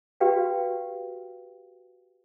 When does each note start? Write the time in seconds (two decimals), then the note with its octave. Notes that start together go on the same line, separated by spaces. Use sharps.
0.21 F#4 G4 B4 D5 F5 G5